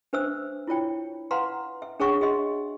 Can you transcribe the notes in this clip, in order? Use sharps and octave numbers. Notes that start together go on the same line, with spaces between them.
D4 B4 C5 E5 E6
E4 F4 C#5 G5
B4 F5 F#5 A#5 C6
E5
D4 G#4 C#5 F#5 C#6
F#4 G#4 D#5 E5 C6